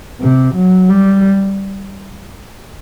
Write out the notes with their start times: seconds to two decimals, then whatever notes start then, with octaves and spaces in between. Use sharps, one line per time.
0.21 C3
0.55 F#3
0.90 G3